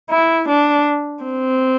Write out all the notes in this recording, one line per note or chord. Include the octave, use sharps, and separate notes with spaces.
E4
D4
C4